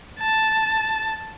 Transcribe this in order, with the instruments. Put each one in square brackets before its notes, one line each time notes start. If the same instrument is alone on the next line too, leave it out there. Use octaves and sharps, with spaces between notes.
[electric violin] A5